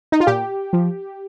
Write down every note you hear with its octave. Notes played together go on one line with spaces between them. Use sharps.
D#4
F4
A#2 G4
F3